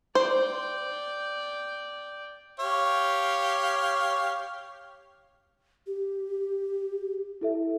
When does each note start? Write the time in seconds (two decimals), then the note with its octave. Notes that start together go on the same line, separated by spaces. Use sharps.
0.15 C5 D5 G5
2.60 G4 C#5 F5
5.87 G4
7.41 E4 A4 E5